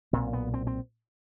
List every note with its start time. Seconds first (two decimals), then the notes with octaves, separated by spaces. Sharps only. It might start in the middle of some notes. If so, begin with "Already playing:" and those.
0.13 B1 A#2 C4
0.33 B3
0.54 C4
0.67 C4